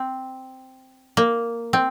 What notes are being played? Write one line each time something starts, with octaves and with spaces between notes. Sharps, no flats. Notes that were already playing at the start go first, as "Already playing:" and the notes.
Already playing: C4
A#3
C4